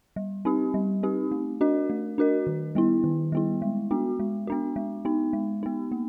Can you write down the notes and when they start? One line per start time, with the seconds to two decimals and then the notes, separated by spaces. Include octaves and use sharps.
0.16 G3
0.45 C4 D#4 G4
0.74 G3
1.03 C4 D#4 G4
1.31 A3
1.61 D4 F#4 A#4 D#5
1.90 A3
2.18 D4 F#4 A#4 D#5
2.47 D#3
2.75 G3 B3 E4
3.04 D#3
3.32 G3 B3 E4
3.62 G#3
3.91 B3 D4 F#4
4.19 G#3
4.47 B3 D4 F#4
4.76 G#3
5.05 B3 D#4
5.33 G#3
5.63 B3 D#4
5.91 A#3